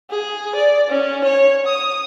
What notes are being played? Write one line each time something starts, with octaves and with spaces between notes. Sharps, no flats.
G#4
D5
C#4
C#5
D#6